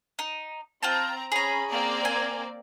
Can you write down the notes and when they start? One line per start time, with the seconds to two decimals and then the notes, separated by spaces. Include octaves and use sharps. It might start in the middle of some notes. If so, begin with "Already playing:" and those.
0.19 D#4
0.83 C4 F4 G5 A5 A#5
1.32 C#4 G#4 A#5 B5
1.71 A#3 C4 D5
2.05 G#5